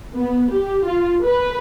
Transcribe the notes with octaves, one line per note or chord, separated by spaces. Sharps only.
B3
G4
F4
B4